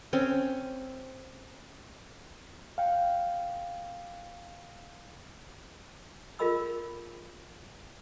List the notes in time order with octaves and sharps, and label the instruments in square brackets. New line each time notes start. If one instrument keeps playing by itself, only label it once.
[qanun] C4 C#4
[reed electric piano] F5 G5
[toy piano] F4 G#4 A#4 D#5 B5 E6